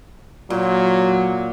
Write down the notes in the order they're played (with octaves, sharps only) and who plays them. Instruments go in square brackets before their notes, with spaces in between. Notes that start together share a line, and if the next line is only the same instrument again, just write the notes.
[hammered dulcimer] A#2 [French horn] F#3